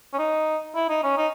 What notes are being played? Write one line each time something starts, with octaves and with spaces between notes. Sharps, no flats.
C#4
D#4
E4
D#4
C#4
D#4